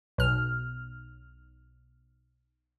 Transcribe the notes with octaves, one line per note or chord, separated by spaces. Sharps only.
B1 F6